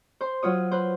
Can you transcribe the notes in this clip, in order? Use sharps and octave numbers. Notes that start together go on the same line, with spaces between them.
C5 C6
F#3 F4 C#5 D#6
B4 C5